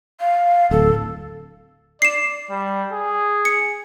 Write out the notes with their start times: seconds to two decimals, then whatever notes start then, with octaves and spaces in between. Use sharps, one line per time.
0.20 F5
0.71 D1 A4
2.02 D5 C7 E7
2.50 G3
2.92 G#4
3.45 C#7